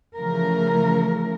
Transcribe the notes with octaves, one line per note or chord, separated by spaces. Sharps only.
C#3 E3 F3 A3 A#4